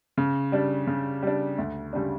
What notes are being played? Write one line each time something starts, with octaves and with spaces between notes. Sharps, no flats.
C#3
G3 D4
C#3
G3 D4
D2
C#3 G3 D4